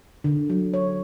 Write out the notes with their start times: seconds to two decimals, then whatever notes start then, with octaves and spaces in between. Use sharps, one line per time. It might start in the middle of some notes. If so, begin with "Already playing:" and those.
0.24 D3
0.50 F#3
0.74 C#5